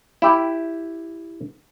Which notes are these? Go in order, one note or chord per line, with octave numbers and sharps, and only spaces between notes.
E4 G4